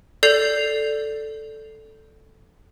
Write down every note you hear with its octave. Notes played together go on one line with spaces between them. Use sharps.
A4 D5 G6 C7 F7